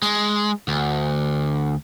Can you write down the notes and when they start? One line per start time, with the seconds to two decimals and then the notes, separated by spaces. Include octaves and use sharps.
0.02 G#3
0.68 D2